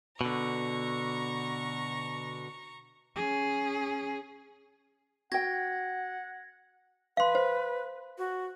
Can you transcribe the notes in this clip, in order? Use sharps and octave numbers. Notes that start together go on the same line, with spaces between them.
B2 D3 A#5 C#6
C#4 G#4
F#4 F#5 G5 G#6 A#6
B4 F5 C6
C5
F#4